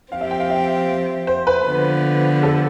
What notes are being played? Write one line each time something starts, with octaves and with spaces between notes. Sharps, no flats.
F3 C4 G4 F5
E5
G5
F5
E5
C5
B4
D3 F3 B3
A4